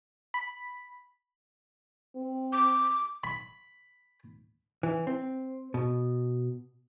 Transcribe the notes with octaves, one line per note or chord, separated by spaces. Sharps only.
B5
C4
D6
B5
E3
C4
B2